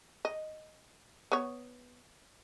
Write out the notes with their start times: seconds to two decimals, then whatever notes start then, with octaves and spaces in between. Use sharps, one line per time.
0.25 D#5
1.32 B3 C#5